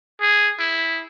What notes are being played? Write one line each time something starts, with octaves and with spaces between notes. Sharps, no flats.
G#4
E4